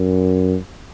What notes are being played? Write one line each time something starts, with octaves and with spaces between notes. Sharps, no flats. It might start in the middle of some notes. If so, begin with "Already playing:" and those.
Already playing: F#2